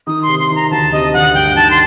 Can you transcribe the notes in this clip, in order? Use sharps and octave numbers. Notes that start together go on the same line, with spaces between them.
D#3 D#6
C6
C3
C6
D#3
A#5
D2 A5
C3 D#5
D2 F#5
G2 G5
D#3 A5
C6